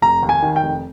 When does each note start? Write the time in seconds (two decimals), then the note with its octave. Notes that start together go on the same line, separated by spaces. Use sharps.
0.02 F1 A#5
0.23 D#2
0.29 G#5
0.42 D#3
0.56 G5
0.62 F1